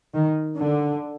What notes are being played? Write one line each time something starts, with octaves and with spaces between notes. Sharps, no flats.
D#3
D3